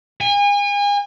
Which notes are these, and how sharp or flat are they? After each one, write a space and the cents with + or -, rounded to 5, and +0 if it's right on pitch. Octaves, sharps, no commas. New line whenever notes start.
G#5 -35